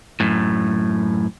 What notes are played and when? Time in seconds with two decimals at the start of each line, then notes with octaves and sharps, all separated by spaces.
0.20 F#2 A2